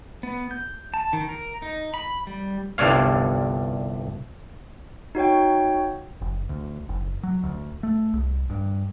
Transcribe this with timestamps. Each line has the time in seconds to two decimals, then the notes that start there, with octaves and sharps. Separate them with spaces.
0.23 B3
0.51 G6
0.94 A5
1.13 D#3
1.29 A#4
1.62 D#4
1.94 B5
2.27 G3
2.78 G1 C2 G2 D4 C#5 F5
5.15 D#4 F#4 C#5 G5
6.21 F#1
6.49 D2
6.89 F#1
7.23 F#3
7.43 D2
7.83 A3
8.13 C2
8.50 G2